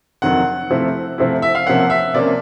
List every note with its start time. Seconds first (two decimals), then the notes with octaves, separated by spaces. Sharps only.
0.22 F2 C3 D#3 F#3 F#5
0.70 C3 F3 A3 C4 E4
1.18 C3 F3 A3 C4 E4
1.42 E5
1.55 F5
1.66 C3 F3 A#3 C#4 F#5
1.90 E5
2.14 C3 F3 A#3 C#4 D5